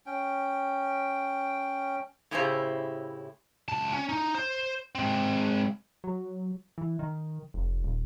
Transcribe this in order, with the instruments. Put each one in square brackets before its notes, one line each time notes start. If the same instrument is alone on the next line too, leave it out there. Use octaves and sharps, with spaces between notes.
[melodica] C#4 G5
[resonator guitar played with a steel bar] A2 C#3 E4 G4 G#4 C5
[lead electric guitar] C#2 A5
C#4
D#4
C5
G#3 C4
[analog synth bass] F#3
E3
D#3
F1
D#1